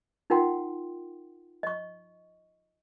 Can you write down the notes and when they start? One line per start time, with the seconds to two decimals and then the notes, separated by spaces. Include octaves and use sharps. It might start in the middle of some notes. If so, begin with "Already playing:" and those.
0.30 D#4 F4 A#4 F#5 G5 C6
1.63 D#5 C#6